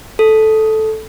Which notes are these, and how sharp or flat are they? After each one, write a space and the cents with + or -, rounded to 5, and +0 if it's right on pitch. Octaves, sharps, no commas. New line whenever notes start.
A4 -10